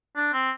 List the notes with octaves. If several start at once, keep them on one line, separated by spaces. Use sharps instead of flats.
D4
C4